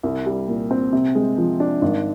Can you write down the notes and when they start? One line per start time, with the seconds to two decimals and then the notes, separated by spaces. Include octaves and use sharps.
0.03 C2
0.26 G3
0.48 A#2
0.71 C4
0.93 C3
1.15 G#3
1.38 F3
1.60 D4
1.82 G#1